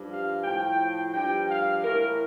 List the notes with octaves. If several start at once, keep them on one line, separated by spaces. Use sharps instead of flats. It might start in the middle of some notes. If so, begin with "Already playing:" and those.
Already playing: G2 F3
F5
A2 F3 G5
G2 F3 G5
F5
A2 E3 A#4